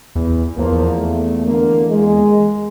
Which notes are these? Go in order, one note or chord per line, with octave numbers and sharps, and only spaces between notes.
E2
E2 F3 A#3
A3
D3 A#3
G#3